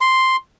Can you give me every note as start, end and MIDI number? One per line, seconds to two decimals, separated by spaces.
0.01 0.36 84